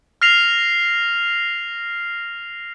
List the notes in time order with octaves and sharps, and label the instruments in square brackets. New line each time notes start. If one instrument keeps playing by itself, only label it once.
[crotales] F6 A#6 C7 F7